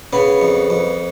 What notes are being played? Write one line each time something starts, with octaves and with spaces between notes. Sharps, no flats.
C#3 B3
F2
F2